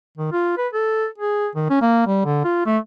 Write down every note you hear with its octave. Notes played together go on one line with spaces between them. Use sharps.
D#3
F4
B4
A4
G#4
D#3
C#4
A#3
G3
D3
F4
A3